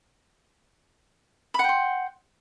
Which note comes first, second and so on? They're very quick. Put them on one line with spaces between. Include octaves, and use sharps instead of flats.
B5 F#5 G5 C6